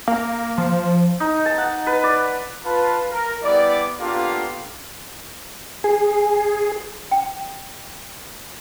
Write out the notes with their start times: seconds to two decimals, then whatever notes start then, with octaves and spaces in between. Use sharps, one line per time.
0.08 A#3
0.58 F3
1.20 D#4
1.46 A5
1.58 F#5
1.87 B4
2.04 D5
2.65 F4 B4 A5
3.11 A#4
3.43 G3 B3 E4 D5
4.00 A#3 B3 D4 F4 G4 A4
5.84 G#4
7.11 G5